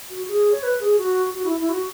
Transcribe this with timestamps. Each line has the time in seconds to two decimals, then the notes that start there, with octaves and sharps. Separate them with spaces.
0.10 F#4
0.28 G#4
0.51 C#5
0.63 B4
0.80 G#4
0.98 F#4
1.33 F#4
1.44 E4
1.57 E4
1.69 F#4